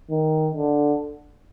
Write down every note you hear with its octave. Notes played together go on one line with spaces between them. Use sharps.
D#3
D3